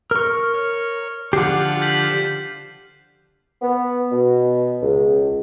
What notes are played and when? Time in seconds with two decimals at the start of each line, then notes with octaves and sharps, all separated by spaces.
0.11 A#4 C#6 F6
0.54 C#5
1.33 D3 F3 G4 F#5 C7
1.82 G6 B6 F#7
3.62 B3
4.11 B2
4.82 C#2